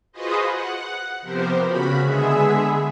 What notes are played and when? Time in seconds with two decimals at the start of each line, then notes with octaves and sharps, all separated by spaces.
0.12 F4 F#4 G#4 B4 C5 D#5
0.47 F#5
1.21 C3 F3 B3 G4 A#4 C5
1.62 C#3 C#4 F#4 B5
1.99 D3 G#3 B3 G#4 E5